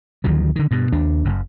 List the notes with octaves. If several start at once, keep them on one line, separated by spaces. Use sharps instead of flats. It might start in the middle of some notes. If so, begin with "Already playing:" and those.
D2 D#3 F3 F#3
D3 D#3
G2 B2
D#2 D4
F#1 F#2